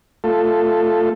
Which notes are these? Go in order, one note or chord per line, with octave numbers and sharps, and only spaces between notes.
A3 F4 A4